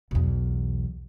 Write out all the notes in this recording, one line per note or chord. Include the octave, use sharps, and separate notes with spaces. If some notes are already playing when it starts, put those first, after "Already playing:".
B1 E2